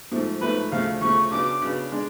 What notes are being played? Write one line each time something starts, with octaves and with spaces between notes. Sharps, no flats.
G#2 F3 A3
G#2 F3 A3 B4
D2 C#3 F3 A3 F5
D2 C#3 F3 A3 C#6
C#3 F#3 B3 D4 D6
C#3 F#3 B3 D4
D3 G#3 D4